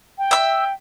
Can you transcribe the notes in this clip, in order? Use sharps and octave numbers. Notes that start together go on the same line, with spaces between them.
G5
E5 E6